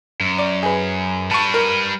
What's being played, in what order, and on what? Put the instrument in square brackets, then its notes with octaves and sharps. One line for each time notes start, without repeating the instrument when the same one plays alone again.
[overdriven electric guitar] F#2
[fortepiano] D5
G#4 B4
[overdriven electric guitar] G3 B4 [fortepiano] A5 C#6
[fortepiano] A#4